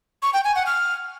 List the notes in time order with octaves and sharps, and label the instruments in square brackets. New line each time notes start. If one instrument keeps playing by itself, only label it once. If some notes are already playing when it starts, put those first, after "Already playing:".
[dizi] C#6
G5
G#5
F#5
F6